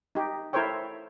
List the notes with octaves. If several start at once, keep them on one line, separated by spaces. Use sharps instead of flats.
D#4 G4
E4 A4 A#4 C5 C#5 G5